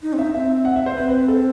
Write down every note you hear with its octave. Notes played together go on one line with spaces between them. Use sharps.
D#4
C4
D#4 E5
C4 E5
F#5
E5
C5
C4 B4
B4
A4